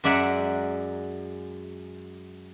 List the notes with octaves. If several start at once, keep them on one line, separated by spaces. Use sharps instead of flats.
F#2 G#3 D5 E5 F#5 A#5